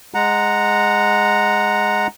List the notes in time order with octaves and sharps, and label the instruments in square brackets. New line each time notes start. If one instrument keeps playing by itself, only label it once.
[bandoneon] G#3 F#5 A#5